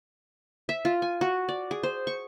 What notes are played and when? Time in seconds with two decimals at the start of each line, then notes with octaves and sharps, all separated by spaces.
0.69 E5
0.85 F4
1.02 G#5
1.21 F#4
1.49 D5
1.71 G#4
1.83 C5
2.07 C#6